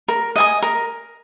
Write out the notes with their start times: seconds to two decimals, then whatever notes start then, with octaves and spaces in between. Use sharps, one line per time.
0.08 A#4
0.36 D#5 G#5 D#6
0.62 A#4